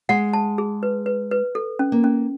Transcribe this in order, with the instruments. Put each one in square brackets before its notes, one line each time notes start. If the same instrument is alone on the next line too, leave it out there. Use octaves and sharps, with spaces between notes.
[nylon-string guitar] G#3 [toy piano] F#5
[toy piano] A5
G#4
B4
B4
B4
A4
C#4
[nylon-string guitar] A#3
[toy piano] C#4